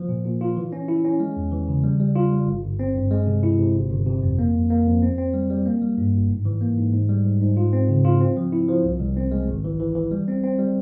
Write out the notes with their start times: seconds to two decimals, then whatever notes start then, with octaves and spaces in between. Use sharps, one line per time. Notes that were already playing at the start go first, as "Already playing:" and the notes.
Already playing: F3
0.09 A#2
0.25 A#2
0.41 F4
0.57 E3
0.72 C#4
0.88 E4
1.04 C#4
1.20 G#3
1.36 E2
1.52 E3
1.68 C#3
1.84 G3
2.00 G3
2.15 F4
2.31 G3
2.47 G1
2.63 G1
2.79 C4
2.96 G2
3.11 G#3
3.27 C3
3.43 E4
3.59 C3
3.74 G1
3.90 G1
4.06 C3
4.23 F2
4.39 A#3
4.55 F2
4.70 A#3
4.87 F2
5.02 C4
5.18 C4
5.34 G3
5.50 G3
5.66 A#3
5.82 G3
5.98 G2
6.14 G1
6.30 G#2
6.45 E3
6.61 A#3
6.77 G#2
6.93 G#2
7.09 G3
7.25 G#2
7.41 G#2
7.57 F4
7.73 C4
7.89 C#3
8.05 F4
8.20 C4
8.37 F3
8.52 E4
8.68 F3
8.84 C2
9.00 C2
9.16 C4
9.32 G#3
9.48 G#1
9.64 E3
9.80 E3
9.96 E3
10.11 G3
10.28 C4
10.43 C4
10.59 G3